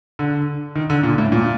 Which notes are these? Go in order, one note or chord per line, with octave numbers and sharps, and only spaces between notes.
D3
D#3
D3
A#2
A2
A#2